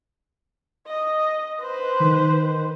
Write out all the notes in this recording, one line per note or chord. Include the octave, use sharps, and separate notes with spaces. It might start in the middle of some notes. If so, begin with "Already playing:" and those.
D#5
B4 C5
D#3